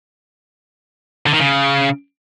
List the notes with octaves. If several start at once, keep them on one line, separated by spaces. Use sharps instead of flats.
D3
D#3
C#3